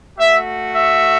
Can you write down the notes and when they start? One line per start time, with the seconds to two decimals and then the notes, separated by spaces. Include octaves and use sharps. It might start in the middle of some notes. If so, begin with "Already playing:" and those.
0.18 A3 F#4 E5
0.76 E5